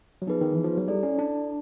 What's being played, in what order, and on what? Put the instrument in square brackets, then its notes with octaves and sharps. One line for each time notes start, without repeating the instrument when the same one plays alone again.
[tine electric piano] F#3
[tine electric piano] F3 [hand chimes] B3 D#4 G#4 B4
[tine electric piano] D#3
E3
F3
F#3
[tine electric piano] G3 [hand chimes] E4 A4 D5
[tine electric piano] C#4
D4